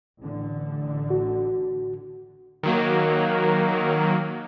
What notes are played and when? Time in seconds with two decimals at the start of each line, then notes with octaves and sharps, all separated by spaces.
0.20 A1 D3
1.10 F#4
2.63 D#3 F#3 A#3